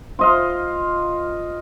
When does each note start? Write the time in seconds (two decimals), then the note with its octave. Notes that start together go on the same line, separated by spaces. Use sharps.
0.19 F4 D#5 F5